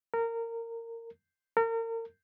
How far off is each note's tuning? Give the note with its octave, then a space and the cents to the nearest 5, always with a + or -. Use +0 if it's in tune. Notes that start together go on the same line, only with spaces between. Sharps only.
A#4 -20
A#4 -35